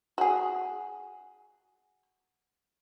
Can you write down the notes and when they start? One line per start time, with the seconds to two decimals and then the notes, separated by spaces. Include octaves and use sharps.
0.18 F#4 G#4